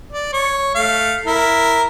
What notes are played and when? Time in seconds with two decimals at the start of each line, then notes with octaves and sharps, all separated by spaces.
0.12 D5
0.33 C#5
0.75 A3 F5
1.25 E4 A#4